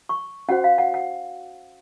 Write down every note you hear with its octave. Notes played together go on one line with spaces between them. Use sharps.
C#6
C#4 F#4 C5 F#5
F5
F#5
F#5